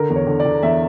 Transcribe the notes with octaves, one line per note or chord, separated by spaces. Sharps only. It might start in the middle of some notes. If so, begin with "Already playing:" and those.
Already playing: D3 A#4
E2
C#5
D3
D5
D3
E2 E5